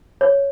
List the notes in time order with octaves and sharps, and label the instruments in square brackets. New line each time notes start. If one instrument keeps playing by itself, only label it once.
[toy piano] C#5